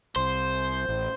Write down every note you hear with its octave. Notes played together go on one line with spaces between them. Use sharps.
C2 C5
A1